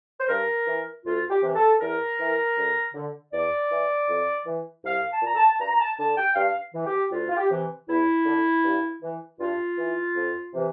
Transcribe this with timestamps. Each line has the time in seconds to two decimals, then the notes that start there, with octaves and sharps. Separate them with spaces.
0.21 C5
0.29 G2 A#4
0.67 E3
1.05 D2 F4
1.29 G4
1.43 C3 E3
1.55 A4
1.80 E2 A#4
2.19 E3
2.57 D2
2.94 D3
3.33 E2 D5
3.71 E3
4.09 F2
4.46 E3
4.84 C2 F5
5.09 A5
5.22 A#2 A#5
5.35 A5
5.60 G2 A#5
5.71 A#5
5.80 A5
5.98 D3 A5
6.17 G5
6.36 G2 F5
6.74 E3
6.86 G4
7.11 D2 F4
7.29 F4
7.37 G4
7.50 C3 E3
7.88 E2 E4
8.25 D3
8.64 G2
9.02 E3
9.39 G2 F4
9.78 E3
10.16 F2
10.54 C3 E3